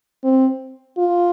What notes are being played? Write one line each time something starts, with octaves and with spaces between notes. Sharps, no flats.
C4
F4